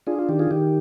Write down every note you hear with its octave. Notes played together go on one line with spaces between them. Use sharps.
D4 F4 G#4
F4
D#3 G4
F4 G#4
D#3 G4